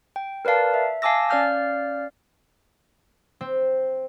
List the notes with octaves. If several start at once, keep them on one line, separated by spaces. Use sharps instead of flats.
G5
A#4 B4 D5 F5 A5
E5
F5 G#5 A5 D6 E6 A#6
C#4 D5 F5 F6 G6
C4